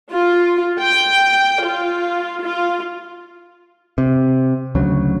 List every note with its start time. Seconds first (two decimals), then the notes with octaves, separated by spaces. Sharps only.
0.12 F4
0.81 G5
1.64 F4
2.43 F4
3.98 C3
4.75 D2 C#3 F#3